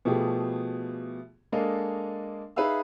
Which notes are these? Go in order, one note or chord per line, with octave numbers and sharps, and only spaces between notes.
B2 F3 A3 G4 G#4
G#3 A#3 D4 A4 D#5 F5
D#4 G#4 B4 E5 F5 E6